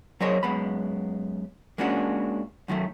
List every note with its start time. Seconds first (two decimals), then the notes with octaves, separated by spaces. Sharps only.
0.20 F#3 G#4 A#4 C5 C#5 D#5
0.43 F#2 G#3 B3 B5
1.78 G#3 A#3 C#4 D4 F#4
2.68 F#2 D#3 F#3 A3